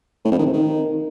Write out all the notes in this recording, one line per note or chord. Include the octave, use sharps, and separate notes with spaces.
A2
F2
D#3
C3
D#3